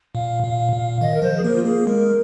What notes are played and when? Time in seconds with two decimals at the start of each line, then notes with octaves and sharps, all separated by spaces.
0.15 A#2 F5
0.43 A#2
0.58 F5
0.72 A#2
1.01 D#3 D#5
1.14 A#4
1.22 F3 C5
1.37 G#4
1.44 A#3 A#4
1.55 F4
1.65 A#3 G#4
1.87 G#3 A#4